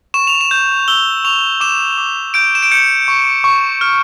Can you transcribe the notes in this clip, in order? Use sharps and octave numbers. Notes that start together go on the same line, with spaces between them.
C#6 E7
F7
E7
G6
E6 G7
C#6 F7
D6 E7
D6
G6 D7
E7
D7
G6 C#7
C#6
C#6
F6